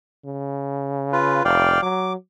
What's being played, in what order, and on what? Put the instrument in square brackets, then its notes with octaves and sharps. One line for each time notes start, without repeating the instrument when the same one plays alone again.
[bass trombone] C#3
[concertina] F4 B4
[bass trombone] F1 [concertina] D5 F5 G5
[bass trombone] F#3 [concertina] D6